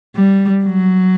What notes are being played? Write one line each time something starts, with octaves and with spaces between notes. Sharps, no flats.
G3
F#3